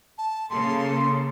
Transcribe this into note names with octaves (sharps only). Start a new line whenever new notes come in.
A5
C#3 A#3 A4 C6